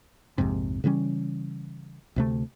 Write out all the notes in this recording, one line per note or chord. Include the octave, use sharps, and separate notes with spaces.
A#1 F2 G#2 C3
C#3 E3 G3 C#4
D2 C3 A3